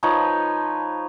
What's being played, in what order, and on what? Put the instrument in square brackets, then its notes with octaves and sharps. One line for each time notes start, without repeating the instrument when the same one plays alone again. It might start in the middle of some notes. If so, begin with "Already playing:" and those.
[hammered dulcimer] F3 D#4 B4 C#5